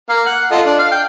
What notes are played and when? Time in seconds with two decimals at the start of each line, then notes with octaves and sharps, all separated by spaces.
0.09 A#3 F5
0.26 F#5
0.52 F4 A4 D#5
0.66 D4
0.79 F5
0.92 G5